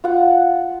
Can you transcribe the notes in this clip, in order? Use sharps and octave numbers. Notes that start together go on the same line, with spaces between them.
F4 F#5